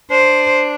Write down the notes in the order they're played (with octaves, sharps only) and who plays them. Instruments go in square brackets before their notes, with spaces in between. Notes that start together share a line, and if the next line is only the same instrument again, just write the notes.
[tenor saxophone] D4 [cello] C5